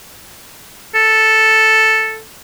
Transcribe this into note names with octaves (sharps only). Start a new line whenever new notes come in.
A4